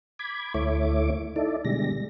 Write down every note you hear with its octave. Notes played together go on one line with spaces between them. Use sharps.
B5 D6 G#6
D2 A3 E4 C#5 D6
D#4 E4 A4 D5
B2 D3 G3 G#3 A#6